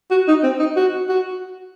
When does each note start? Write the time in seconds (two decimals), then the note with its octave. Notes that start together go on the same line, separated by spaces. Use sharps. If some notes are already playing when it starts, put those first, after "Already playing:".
0.11 F#4
0.28 D#4
0.43 C4
0.60 D#4
0.77 F#4
1.09 F#4